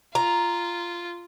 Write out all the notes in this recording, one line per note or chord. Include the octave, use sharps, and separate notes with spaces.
F4 A#5